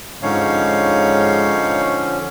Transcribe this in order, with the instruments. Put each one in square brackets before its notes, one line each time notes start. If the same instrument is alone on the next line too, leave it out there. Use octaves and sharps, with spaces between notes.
[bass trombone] G#2 [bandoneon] D3 F3 C#4 [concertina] D#4 C#5 F5